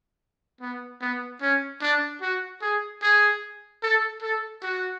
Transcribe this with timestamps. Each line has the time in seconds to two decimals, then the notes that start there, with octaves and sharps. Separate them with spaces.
0.61 B3
1.01 B3
1.42 C#4
1.82 D4
2.22 F#4
2.62 G#4
3.02 G#4
3.83 A4
4.22 A4
4.63 F#4